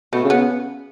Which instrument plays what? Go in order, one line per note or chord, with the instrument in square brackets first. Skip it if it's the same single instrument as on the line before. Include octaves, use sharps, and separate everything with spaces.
[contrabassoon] B2 [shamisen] A3
[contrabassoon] C#3
[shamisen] B3